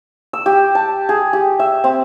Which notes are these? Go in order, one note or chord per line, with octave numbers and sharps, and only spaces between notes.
E6
G4
A5
G#4
G4
E5
C4